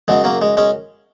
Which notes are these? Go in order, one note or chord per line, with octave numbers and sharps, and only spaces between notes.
F#2 C#3 F#3 G#3
F#3 A#3
G#3
G#3 C#4